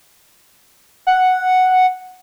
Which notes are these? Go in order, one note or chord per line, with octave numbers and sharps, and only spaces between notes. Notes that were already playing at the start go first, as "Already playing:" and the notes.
F#5